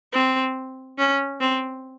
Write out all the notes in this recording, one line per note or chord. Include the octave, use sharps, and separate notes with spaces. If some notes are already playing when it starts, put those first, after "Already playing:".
C4
C#4
C4